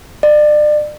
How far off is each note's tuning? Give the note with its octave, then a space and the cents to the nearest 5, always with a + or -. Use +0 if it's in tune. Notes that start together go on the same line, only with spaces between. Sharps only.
D5 +35